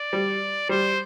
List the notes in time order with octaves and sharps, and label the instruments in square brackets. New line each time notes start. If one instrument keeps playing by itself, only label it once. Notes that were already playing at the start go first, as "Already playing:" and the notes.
Already playing: [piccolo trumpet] D5
[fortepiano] G3
[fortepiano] G3 [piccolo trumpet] C5